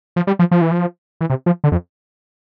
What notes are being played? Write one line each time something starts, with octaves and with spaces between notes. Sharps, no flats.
F3
G3
F3
F3
E3
F3
E3
C3
F3
D3
F2